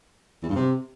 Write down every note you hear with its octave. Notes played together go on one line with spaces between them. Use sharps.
E2
G2
C3